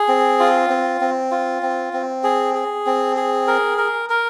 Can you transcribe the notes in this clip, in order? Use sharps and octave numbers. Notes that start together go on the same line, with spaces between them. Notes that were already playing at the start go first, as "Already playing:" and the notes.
Already playing: G#4
C4
F4
C4
C4
F4
C4
C4
G#4
G#4
C4
G#4
A#4
A#4
A#4